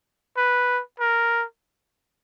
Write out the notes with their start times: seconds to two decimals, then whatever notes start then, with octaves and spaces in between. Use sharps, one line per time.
0.37 B4
1.00 A#4